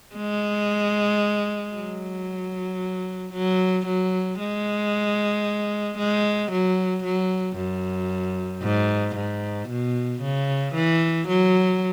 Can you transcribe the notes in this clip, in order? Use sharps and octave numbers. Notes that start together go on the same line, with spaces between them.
G#3
F#3
F#3
F#3
G#3
G#3
F#3
F#3
F#2
G#2
G#2
B2
C#3
E3
F#3